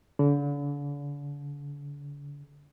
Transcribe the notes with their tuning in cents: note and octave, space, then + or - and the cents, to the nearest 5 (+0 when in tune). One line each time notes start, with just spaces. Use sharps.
D3 -40